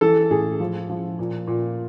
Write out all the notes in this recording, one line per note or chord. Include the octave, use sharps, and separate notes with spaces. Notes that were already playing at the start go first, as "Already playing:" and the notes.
E3 A4
A2 G#4
F3
F3
A#2
A#2